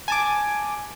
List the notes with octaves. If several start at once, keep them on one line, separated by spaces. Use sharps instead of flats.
G#5 A5 D6